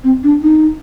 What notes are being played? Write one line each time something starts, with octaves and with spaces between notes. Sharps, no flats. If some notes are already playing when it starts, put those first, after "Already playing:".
C4
D4
D#4